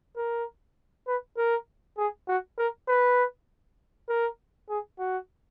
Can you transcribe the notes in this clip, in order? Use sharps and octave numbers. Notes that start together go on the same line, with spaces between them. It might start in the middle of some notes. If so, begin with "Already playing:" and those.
A#4
B4
A#4
G#4
F#4
A#4
B4
A#4
G#4
F#4